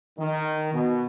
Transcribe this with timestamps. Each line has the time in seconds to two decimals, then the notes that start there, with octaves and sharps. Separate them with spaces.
0.19 D#3
0.74 B2